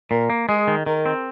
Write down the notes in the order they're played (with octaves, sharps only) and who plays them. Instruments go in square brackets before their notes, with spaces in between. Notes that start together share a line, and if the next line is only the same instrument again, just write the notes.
[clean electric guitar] A#2 [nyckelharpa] A#4
[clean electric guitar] A#3
[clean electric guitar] G#3 [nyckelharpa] G#4
[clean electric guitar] D#3
[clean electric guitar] D#3 [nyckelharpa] A#4
[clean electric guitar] C4